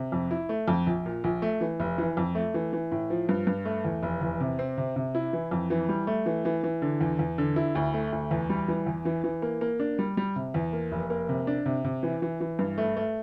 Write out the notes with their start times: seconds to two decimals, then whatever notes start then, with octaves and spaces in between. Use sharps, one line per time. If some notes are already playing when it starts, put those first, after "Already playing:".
Already playing: C3
0.12 F2
0.31 E4
0.49 A3
0.68 F2
0.87 A#1
1.06 A#2
1.24 A#1
1.42 A3
1.61 E3
1.80 F1
1.98 E3
2.17 F2
2.35 A3
2.54 E3
2.73 E3
2.92 A2
3.10 F3
3.29 G2
3.47 G2
3.65 A3
3.85 E2
4.03 F1
4.21 E2
4.40 C3
4.59 C4
4.78 C3
4.96 C3
5.15 E4
5.33 E3
5.51 F2
5.70 E3
5.89 G3
6.07 A3
6.26 E3
6.45 E3
6.63 E3
6.82 D3
7.01 E2
7.19 E2
7.38 D3
7.56 E4
7.75 D2
7.94 A3
8.12 D2
8.31 E2
8.50 G3
8.68 E3
8.86 E2
9.05 E3
9.24 E3
9.42 A#3
9.61 A#3
9.80 D4
9.99 G3
10.17 G3
10.36 C3
10.54 E2
10.73 A#3
10.92 F1
11.10 A#3
11.29 C3
11.47 D4
11.66 C3
11.84 C3
12.03 E3
12.22 E3
12.40 E3
12.59 G2
12.78 A3
12.97 A3